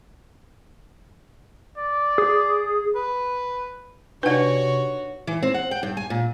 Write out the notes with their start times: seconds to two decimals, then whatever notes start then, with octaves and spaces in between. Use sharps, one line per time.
1.78 D5
2.18 G#4
2.95 B4
4.23 C3 D4 D#4 F#4 B4 C#5 D5 F#5
5.27 E3
5.43 C4
5.54 F#5
5.71 G5
5.83 G2
5.97 G#5
6.10 A#2